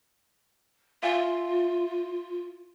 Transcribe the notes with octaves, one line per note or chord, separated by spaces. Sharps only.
F4 E5 F5 G#5